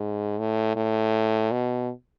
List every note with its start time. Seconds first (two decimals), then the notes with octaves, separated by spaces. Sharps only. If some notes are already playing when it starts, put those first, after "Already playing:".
Already playing: G#2
0.39 A2
0.76 A2
1.51 B2